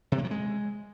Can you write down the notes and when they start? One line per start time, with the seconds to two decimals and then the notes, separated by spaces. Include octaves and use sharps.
0.12 C3
0.18 A#3
0.25 F#3
0.31 G#3